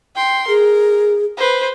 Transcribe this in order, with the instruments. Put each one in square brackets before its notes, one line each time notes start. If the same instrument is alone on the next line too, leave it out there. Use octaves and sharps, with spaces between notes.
[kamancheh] G5 C6
[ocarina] G#4 [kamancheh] A#4
[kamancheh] B4 C5